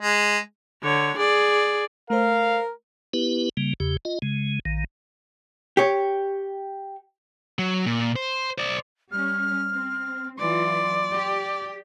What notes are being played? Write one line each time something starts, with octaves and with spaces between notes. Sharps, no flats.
G#3
D3 C#5
G#4 D5
A3 A#4 C5 F5
B3 E4 G4 B4
C#3 G3 A#3
E2 C#3 G4
F4 D#5
C#3 G#3
A#1 D#3
G4 C#5
F#3
A#2
C5
C5 D5
G3 C#4 F6
C4
E3 F#3 F4 D5 C6
G4